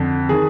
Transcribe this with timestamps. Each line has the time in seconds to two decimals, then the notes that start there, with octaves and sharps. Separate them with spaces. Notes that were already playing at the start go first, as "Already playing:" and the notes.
Already playing: F2 D3
0.29 D#3 G#4